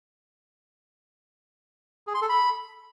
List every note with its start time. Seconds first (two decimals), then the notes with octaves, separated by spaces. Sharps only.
2.07 G#4
2.14 C6
2.22 A4
2.29 B5